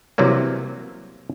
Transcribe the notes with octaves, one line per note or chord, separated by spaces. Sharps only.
C3 E3 F#3 G3 A#3